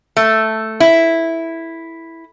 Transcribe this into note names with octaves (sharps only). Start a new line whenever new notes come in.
A3
E4